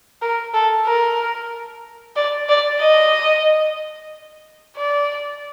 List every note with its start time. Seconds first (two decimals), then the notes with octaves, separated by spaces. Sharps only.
0.22 A#4
0.54 A4
0.86 A#4
2.16 D5
2.49 D5
2.81 D#5
4.76 D5